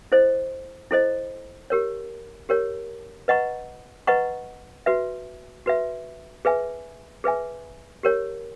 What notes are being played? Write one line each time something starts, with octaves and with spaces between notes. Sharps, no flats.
E4 A4 C5 D#5
E4 A4 C5 D#5
G4 A#4 C#5
G4 A#4 C#5
B4 D#5 F#5 A#5 C#6
B4 D#5 F#5 A#5 C#6
F#4 B4 E5
F#4 B4 E5
G#4 B4 E5 G#5
G#4 B4 E5 G#5
G4 A#4 C#5